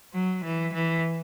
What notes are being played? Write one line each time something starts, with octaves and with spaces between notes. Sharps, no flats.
F#3
E3
E3